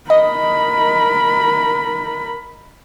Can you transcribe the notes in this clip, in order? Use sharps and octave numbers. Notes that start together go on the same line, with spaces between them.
A#4 D#5 B5